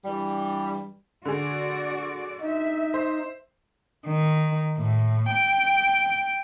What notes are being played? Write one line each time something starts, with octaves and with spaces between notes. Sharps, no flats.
G2 E3 G3
D3 F#4 G#4 D5
D#4 E5
C5
D#3
A2
G5